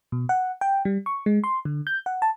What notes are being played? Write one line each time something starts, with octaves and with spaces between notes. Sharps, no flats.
B2
F#5
G5
G3
C#6
G#3
C6
D3
G6
F#5
A5